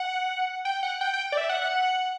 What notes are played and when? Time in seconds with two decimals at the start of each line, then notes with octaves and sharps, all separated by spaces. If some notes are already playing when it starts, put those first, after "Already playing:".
Already playing: F#5
0.65 G5
0.83 F#5
1.01 G5
1.14 G5
1.32 D5
1.37 E5
1.49 F#5
1.62 F#5